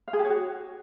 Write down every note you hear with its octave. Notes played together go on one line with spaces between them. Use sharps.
F5
G#4
G4
C#5
F#4